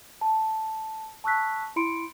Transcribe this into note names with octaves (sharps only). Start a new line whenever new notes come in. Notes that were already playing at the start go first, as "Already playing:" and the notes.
A5
A5 C#6 E6 F#6 B6
E4 B5 C6 C#7 D7